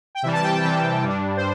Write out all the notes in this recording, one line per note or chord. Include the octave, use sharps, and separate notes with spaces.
G5
C3 E3 G3 E5
A5
G5
A5
C3 E3 G3 G5
G2 G3 D4
C5